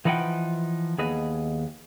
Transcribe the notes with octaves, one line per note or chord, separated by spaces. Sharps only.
E3 F3 D#4 B4 F#5 G5
D#2 B3 G#4 B4 D#5